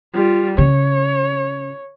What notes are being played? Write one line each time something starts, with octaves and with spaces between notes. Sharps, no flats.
G3 F4
C#3 C#5